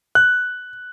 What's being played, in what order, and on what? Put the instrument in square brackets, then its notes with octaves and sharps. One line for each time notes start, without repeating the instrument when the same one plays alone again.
[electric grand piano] F#6